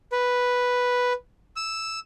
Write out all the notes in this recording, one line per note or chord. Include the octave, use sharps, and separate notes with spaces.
B4
E6